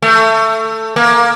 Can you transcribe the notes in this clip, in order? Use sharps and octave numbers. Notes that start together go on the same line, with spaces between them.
A3
A#3